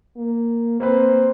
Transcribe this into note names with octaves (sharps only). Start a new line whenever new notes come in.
A#3
A#3 C4 B4 C5